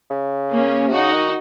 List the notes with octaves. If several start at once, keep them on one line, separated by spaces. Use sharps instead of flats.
C#3
A#3 C#4
C3
C#3 D#4 F#4
D#3